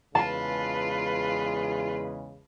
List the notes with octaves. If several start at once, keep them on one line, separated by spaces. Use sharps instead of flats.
E2 C#3 G#3 F4 B4 A5